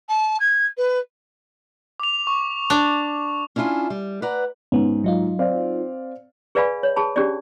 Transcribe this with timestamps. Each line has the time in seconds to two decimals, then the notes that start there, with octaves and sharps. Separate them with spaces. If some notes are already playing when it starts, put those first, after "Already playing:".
0.09 A5
0.40 G#6
0.77 B4
2.00 D6 F7
2.27 C#6
2.70 D4
3.56 C#4 D4 E4 F4 G#5
3.90 G3
4.22 B4 D5 F#5 A#5
4.72 G#2 B3 C#4
5.04 F#3 D#4 F4
5.39 C4 D5 F5
6.55 G#4 B4 D5 F5 G#5 B5
6.83 C#5
6.96 G#4 A5 B5
7.16 C#4 D4 G4 G#4 D5